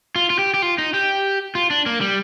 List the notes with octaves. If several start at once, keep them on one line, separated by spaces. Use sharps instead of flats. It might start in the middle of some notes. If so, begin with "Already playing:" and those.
F4
F4
G4
G4
F4
D#4
G4
F4
D4
A#3
G3